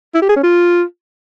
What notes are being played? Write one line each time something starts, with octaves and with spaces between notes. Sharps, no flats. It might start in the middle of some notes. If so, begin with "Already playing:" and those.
E4
G4
G#4
C#4
F4